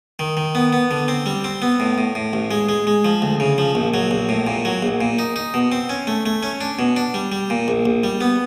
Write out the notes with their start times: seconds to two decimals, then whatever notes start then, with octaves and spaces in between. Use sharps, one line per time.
0.19 D#3
0.37 D#3
0.55 B3
0.73 B3
0.91 D3
1.08 C4
1.26 G3
1.44 C4
1.62 B3
1.80 A2
1.98 A2
2.15 A2
2.33 A1
2.51 G#3
2.69 G#3
2.87 G#3
3.05 F3
3.22 D2
3.40 C#3
3.58 F3
3.75 A#1
3.94 F#3
4.11 A#1
4.29 A2
4.47 A#2
4.65 F#3
4.83 A#1
5.01 A#2
5.19 D#4
5.36 D#4
5.54 B2
5.72 C4
5.89 C#4
6.07 A3
6.26 A3
6.43 C#4
6.61 D4
6.79 B2
6.96 D4
7.14 G3
7.32 G3
7.50 A#2
7.68 A#1
7.86 A#1
8.04 G3
8.21 B3